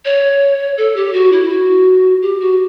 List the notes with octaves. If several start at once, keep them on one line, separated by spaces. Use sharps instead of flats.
C#5
A4
G4
F#4
E4
F#4
G4
F#4